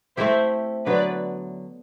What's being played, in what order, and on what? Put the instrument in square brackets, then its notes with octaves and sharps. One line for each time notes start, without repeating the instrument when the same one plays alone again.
[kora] A3 C4 E4 G4 [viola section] C5 E5
[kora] D3 F#3 B3 [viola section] B4 D5